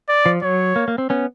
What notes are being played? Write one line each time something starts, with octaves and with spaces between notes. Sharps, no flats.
D5
F3
F#3 C#5
A#3
A#3
C4
B3 C#4